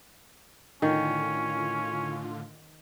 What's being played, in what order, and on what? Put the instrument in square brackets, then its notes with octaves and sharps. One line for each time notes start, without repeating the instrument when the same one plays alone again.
[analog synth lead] A2 [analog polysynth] D3 F4 [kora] D#3 [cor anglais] C#4